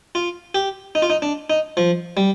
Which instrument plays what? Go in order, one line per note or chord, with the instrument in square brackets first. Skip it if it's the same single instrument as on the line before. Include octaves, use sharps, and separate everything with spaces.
[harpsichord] F4
G4
D#4
F4
D#4
D4
D#4
F3
G3